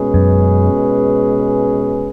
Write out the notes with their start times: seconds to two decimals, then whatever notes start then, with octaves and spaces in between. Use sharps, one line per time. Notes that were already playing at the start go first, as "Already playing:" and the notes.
Already playing: B2 G#3 C#4 G#4 B4
0.14 F#2